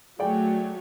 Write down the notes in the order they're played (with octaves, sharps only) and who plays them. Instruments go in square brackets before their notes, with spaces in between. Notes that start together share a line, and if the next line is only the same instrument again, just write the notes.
[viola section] F#3 A3 C#5 [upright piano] G#4 D5 G5